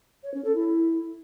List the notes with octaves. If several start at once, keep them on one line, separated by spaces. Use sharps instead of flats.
C#5
C#4
A4
E4